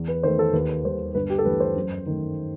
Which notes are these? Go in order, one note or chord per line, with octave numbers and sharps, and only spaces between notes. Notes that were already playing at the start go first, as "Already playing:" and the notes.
Already playing: E2
B4
D#3 A3 C5
A4
D#2 B4
D#3 G3 C5
G1 B4
G4
A4
G2 E3 A3 B4
C5
F#2
D#3 A3